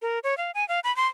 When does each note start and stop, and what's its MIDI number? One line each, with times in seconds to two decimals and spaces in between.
0.02 0.19 70
0.24 0.37 73
0.38 0.51 77
0.55 0.67 80
0.68 0.80 77
0.84 0.94 83
0.96 1.07 84